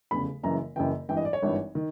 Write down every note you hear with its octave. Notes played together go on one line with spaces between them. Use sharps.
F1 E2 C#3 B5
F#1 F#2 C#3 E3 A#5
F#1 F#2 C#3 E3 G5
G#1 G2 E3 G5
D#5
D5
C#5
G#1 G2 E3
D#3